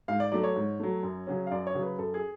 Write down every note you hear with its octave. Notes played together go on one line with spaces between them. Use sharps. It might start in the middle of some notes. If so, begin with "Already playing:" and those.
G#2 F5
D5
F#3 A3 D5
C#5
G#2
F#3 A3
F#2
C#3 F#3 C#4
F5
F#2 D5
C#5
C#3 F#3 C#4
B4
F#2 A4
G#4